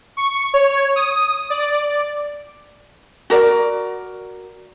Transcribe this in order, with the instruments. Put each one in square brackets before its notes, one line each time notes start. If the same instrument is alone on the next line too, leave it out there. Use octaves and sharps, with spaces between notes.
[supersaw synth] C#6
C#5
D#6
D5
[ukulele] F#4 A#4 D5